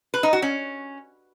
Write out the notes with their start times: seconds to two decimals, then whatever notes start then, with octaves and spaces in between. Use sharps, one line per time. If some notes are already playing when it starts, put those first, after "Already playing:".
0.14 B4
0.23 D#4
0.33 F#4
0.42 C#4